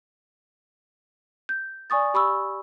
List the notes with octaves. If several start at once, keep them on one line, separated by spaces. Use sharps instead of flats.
G6
D5 G#5 C#6 D#6 A6
G4 B5 C#6 E6